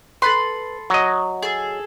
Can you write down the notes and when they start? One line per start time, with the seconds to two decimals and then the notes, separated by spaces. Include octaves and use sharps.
0.22 A4 B4 B5 C6
0.90 F#3 D#5
1.42 G#4 A4